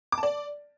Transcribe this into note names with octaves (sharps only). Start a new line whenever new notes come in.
D6
A5
D5